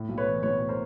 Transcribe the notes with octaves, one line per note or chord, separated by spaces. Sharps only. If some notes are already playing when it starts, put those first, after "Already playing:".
Already playing: A2
B1
B4 C#5
E3
B1 B4 C#5
A2
A#4 C5